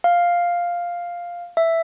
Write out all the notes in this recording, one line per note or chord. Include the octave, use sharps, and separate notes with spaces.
F5
E5